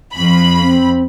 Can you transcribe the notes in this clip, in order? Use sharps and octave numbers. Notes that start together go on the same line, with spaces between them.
F2 B5
C4